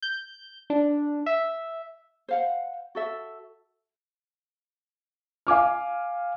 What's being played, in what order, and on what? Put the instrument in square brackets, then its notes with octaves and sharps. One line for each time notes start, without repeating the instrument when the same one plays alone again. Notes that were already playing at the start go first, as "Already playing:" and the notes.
[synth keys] G6
D4
E5
[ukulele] C5 F5 F#5
F#4 A4 E5
[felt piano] F5 G#5 D6 F6